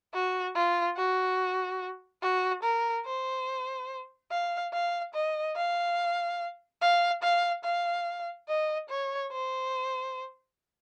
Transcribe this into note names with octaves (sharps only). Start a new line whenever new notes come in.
F#4
F4
F#4
F#4
A#4
C5
F5
F5
D#5
F5
F5
F5
F5
D#5
C#5
C5